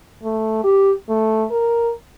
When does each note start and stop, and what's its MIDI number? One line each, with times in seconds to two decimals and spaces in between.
0.23 0.60 57
0.64 0.91 67
1.09 1.44 57
1.51 1.91 70